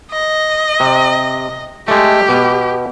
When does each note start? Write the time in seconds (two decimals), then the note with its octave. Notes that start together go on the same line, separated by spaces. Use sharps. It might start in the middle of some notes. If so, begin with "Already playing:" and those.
0.12 D#5
0.80 C3
1.88 G#3 A3 G4
2.29 B2